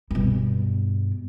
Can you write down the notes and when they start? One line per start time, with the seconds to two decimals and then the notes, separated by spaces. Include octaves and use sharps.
0.11 G2 B2